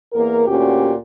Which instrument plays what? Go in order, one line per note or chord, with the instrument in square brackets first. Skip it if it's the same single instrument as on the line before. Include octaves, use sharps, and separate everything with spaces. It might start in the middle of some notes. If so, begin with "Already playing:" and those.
[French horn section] E2 A#3 A#4
D2 A#2 C#4 F#4 G4